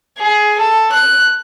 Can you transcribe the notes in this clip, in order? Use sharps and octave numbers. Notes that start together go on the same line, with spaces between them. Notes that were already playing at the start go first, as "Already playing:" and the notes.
G#4
A4
F#6